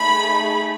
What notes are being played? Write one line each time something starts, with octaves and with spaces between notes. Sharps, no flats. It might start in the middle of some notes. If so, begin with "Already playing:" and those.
Already playing: A3 D#4 G#4 B5